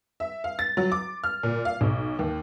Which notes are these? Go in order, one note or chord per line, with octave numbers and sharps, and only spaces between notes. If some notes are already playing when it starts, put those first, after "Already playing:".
E5
F5
A6
F#3
D6
F6
A#2
F5
B1
D#2